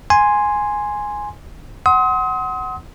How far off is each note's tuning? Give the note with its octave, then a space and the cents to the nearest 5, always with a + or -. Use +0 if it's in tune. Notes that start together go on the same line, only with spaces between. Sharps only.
G#5 +0 C6 +0
F#5 +10 C6 +0 D#6 +35